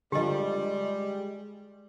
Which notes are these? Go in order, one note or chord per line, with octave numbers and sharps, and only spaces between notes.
D3 F3 G3 G#3 G4 D#5